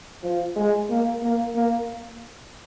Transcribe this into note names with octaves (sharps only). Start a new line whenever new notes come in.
F3
G#3
A#3
A#3
A#3